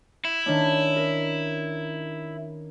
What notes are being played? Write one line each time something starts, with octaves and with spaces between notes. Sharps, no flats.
E4
D#3 C#4 D4
A#4